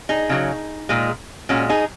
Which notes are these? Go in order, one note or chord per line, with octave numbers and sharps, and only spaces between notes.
D#4 G#4
C#3 F#3
A#2 G#3
A#2 G#3 C#4 F#4
D#4 G#4